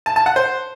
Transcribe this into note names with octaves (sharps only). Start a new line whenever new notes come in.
A5
A5
F#5
C5